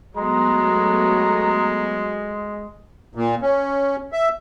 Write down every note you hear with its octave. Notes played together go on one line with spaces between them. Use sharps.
F#3 G#3 A3 B3 A#5
A#2
C#4
E5